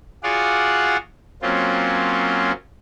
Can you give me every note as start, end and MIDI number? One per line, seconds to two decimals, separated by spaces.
0.23 0.97 65
0.23 0.97 66
0.23 0.97 68
0.23 0.97 74
0.23 0.97 77
0.23 0.97 78
1.42 2.52 54
1.42 2.52 58
1.42 2.52 60
1.42 2.52 61
1.42 2.52 65